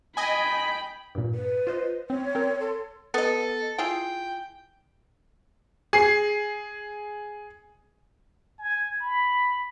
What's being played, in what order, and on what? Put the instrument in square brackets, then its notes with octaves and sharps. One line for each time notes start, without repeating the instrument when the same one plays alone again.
[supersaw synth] D#5 G#5 [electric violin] G5 B5
[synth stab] G2 A#2
[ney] B4
[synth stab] F4 C5 D#5
[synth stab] C4 [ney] C#5
[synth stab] C4 A#4
[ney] A4 [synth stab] C6
[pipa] B3 D#5 [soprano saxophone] A4
[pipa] E4 F4 G#4 [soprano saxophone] G5
[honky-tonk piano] G#4 C7
[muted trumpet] G#5
B5